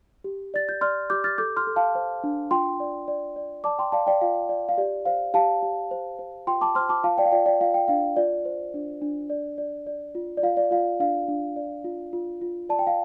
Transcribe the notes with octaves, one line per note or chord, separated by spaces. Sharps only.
G4
D5 A6
G6
D5 C6 F6
G4 D6 G6
F6 A6
A4 D6 G6
C6 F6
A4
F5 A5
C5
D4
F4 G5 C6
D5
D5
D5
D5 A5 D6
G5 C6
D5 F5 A5
D5 G5
F4 F5
D5
F5
G4 D5
C5 F5
G4 F5 A5
G4
C5
C5
F4 G5 C6
A5 D6
C5 C6 F6
A5 D6
F4 F5 A5
D5 G5
F5
F4 D5 G5
D5 G5
F4 F5
G5
D4 F5
F4 D5
C5
D4
D4
D5
D5
D5
F4
D5
F4 F5
D5
F4 F5
D4 F5
D4
D5
F4
F4
F4
D5 A5
G5
F5